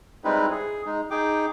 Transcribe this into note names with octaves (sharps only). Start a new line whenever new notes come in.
G3 G#3 C4 D#4 E4 B4
G#4
G#3 D#4
D#4 G#4 G5 D6